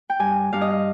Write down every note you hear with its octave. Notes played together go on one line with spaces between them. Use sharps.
G5
G2 G#5
G2 F5
D#5
F5